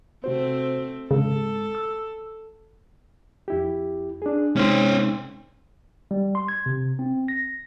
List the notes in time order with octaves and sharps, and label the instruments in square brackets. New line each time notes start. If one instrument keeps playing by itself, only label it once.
[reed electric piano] C3 F#4 C5 [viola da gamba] A3 C4
[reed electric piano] G#2 G#3 [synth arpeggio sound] C#3 [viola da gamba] A4
[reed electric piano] E6
F2 E4 G4
D4 G#4
[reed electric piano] C3 G#3 D#4 [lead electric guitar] C#4 C5
[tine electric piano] G3
C6
G#6
C3
C4
A#6